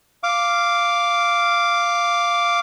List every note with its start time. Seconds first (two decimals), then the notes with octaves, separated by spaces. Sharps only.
0.23 F5 D6